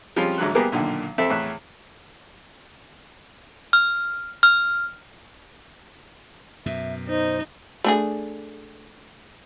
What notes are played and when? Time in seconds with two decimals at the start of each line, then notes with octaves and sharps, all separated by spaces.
0.16 F3 G3 G#3 C4 C#4 F4
0.38 A1 G#2 D3 F#3 F#6
0.55 G3 A#3 B3 G4 G#4 A#4
0.72 B1 A#2 D3 D#3
1.18 F2 C4 A4 E5
1.30 E2 A2 E5 F#6
3.73 F6
4.43 F6
6.66 F#2 B2 E5
7.08 D#4 C5
7.84 A3 D4 G#4